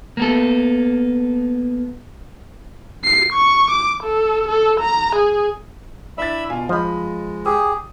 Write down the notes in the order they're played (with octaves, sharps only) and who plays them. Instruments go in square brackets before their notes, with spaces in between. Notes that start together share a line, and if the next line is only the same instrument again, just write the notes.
[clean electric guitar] A#3 B3 A4
[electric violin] C7
C#6
D6
A4
A4
A#5
G#4
[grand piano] D4 E4 A6 [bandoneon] E5 B5 E6
[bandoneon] B2 [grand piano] F4 [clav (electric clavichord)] G#5
[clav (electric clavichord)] F3 [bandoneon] G#3 [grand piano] D#5 B5
[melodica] G4 G#4 [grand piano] D#6